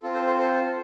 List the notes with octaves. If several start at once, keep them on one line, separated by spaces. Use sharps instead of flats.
C4 F4 A4
A4 C5
A4 C5
A4 C5